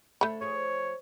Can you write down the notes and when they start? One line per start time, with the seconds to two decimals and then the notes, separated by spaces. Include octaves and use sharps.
0.21 D3 A3 D4 C#5 B5
0.41 F3 G#4 C#5